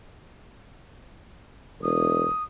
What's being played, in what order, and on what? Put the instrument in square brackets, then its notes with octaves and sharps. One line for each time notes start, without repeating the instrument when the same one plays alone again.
[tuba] E1 [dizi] D#6